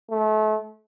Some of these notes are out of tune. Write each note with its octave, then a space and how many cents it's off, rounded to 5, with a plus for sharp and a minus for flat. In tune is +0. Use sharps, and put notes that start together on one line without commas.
A3 -35